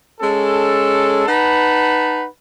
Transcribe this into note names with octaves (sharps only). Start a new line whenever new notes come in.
G#3 C#4 A4
D#4 B4 F#5 A5 B5